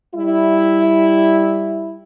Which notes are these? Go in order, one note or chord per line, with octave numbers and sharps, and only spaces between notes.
G3 E4